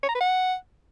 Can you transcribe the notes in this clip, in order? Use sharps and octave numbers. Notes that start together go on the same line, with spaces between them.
C#5
A#5
B4
F#5